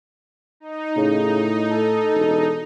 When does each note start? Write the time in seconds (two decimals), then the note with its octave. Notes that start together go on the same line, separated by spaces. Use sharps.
0.60 D#4
0.96 A2 C#3
1.71 A4
2.14 E1